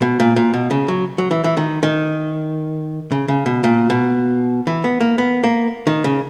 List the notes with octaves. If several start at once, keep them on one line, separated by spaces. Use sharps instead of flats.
B2
A#2
A#2
B2
C#3
F#3
F#3
E3
E3
D#3
D#3
C#3
C#3
B2
A#2
B2
E3
B3
A#3
B3
A#3
D#3
C#3